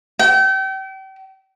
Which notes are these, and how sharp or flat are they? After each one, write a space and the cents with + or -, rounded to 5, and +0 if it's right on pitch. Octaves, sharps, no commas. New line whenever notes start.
G5 -35